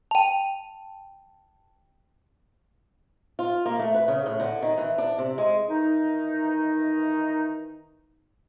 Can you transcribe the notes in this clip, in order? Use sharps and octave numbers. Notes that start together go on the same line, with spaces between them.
G5 A5
F4
A#3
A3
B4
C#3
A2
D3
D#3
E3
D4
C3
G#3
D#3 E3 D#4